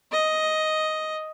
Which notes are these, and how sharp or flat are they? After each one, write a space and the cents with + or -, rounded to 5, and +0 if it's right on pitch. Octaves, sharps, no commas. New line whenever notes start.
D#5 +5